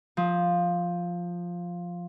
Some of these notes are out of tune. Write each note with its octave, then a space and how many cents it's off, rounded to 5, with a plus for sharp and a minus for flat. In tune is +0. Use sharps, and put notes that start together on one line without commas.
F3 +5 D#6 +30